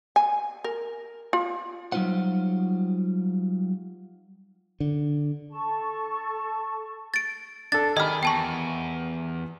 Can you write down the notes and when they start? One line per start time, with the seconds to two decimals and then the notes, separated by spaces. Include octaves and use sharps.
0.16 G#5
0.64 A#4
1.33 F4
1.92 F#3 G3 D#4 F4 C5 F#5
4.80 D3
5.50 A4 A5 C#6
7.14 A6 D7
7.72 D4 A4 A6
7.97 D#3 G4 G#4 D#5 B5 F6
8.23 E2 G5 A5 C#6